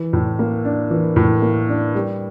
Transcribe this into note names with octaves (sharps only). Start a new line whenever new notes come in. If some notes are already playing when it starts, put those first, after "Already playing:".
Already playing: E3
A2
A#3
D4
E3
A2
A#3
D4
G3